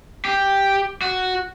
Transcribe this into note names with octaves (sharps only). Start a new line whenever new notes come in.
G4
F#4